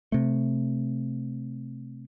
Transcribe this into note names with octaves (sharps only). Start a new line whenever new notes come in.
C3 A3